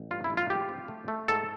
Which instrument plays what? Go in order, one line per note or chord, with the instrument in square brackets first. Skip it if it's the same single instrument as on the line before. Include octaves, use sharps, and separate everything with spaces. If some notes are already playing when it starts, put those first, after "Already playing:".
Already playing: [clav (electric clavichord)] A1
G2 F4
E4
A1
F4
G#2 G4
C4
A3
A3
G#2 A4